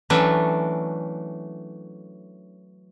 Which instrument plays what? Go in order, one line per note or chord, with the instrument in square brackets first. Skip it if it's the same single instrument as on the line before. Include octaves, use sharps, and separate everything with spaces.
[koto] E3 F#3 A3 C#4 D4